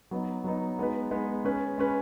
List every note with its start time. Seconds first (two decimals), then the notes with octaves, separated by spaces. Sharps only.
0.11 F#3 B3 D#4
0.44 F#3 B3 D#4
0.79 G#3 B3 D#4 B4
1.11 G#3 B3 D#4 B4
1.45 G#3 C#4 B4
1.78 G#3 C#4 B4